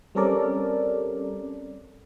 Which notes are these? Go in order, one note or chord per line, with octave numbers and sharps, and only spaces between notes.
G3 C4 C#4 A4 A#4 D5